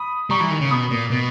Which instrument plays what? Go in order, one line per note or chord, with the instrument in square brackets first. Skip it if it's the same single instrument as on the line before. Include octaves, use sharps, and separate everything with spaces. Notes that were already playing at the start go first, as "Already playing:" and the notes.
Already playing: [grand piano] B5 D#6
[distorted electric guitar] G3 [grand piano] A#5 C#6
[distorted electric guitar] E3
D#3
C#3
[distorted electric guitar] B2 [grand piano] B5 D#6
[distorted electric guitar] A#2
B2